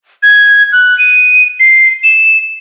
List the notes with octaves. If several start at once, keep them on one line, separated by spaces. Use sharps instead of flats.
G#6
F#6
D#7
C7
E7